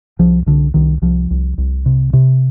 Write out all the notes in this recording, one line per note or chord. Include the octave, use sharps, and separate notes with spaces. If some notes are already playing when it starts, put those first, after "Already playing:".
C2 F3
C2 D3
C2 D#3
C2 F3
C2
C2
C3
C3